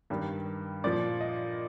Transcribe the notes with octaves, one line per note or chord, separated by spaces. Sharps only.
G2 D#3 G3
A#2 F3 D5
D#5